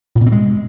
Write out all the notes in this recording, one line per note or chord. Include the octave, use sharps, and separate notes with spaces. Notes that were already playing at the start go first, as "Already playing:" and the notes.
A#2
B2
C4
G#3